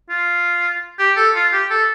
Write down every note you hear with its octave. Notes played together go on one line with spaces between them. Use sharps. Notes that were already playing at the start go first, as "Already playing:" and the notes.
F4
G4
A4
F4
G4
A4